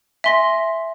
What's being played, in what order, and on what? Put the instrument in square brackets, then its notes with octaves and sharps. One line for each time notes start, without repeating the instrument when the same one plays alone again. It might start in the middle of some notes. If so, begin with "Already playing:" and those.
[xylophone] E5 G#5 C6 A#6 B6